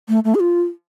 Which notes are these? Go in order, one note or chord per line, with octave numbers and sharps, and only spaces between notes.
A3
A3
G#4
F4